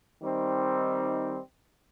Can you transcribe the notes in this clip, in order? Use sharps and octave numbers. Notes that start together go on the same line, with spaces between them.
D#3 G3 C4 D#4